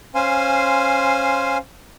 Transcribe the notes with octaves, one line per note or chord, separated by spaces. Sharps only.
C#4 C5 F5 G#5 C6